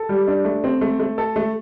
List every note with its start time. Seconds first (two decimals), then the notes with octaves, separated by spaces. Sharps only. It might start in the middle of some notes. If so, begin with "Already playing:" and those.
Already playing: A4
0.09 G3
0.27 D4
0.45 A3
0.64 C4
0.81 A3
0.99 A3
1.18 A4
1.36 A3